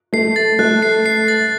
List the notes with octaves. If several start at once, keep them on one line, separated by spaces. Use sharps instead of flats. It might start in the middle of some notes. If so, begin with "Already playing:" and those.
A3 C7
A6
A3 F#6
C7
C7
A6